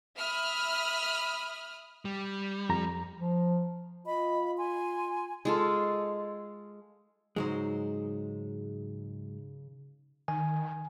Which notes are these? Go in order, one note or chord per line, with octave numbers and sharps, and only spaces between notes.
E5 B5 D#6 F6
G3
F2 A#5
F3
F4 D#5 B5
G#5 C6
G#3 F4 A4
G#2 C#3 F#3 G#3 D#4 C5
D#3 G#5